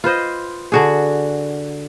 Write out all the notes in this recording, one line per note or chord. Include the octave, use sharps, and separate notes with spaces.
F4 B4 C5 D#5
D3 F#4 G#4